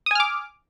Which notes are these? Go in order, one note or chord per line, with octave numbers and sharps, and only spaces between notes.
G#5 D6 D#6 F6